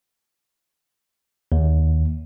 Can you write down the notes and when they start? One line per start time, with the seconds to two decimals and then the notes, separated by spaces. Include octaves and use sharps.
1.52 D#2